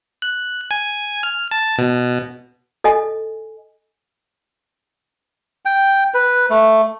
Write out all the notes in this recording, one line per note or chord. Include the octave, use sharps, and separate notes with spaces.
F#6
G#5
F6
A5
B2
A4 D#5 G#5
G5
B4
A3